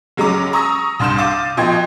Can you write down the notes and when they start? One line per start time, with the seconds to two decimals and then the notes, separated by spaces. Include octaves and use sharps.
0.17 F#1 F#3 G#3 C#4 A#5 D6
0.53 A#5 C#6 D#6 E6 A#6
0.99 C2 G2 C6 F6 G6 E7
1.18 F5 D6 A6 D#7
1.57 B2 F3 D#5 G5 C6 G#6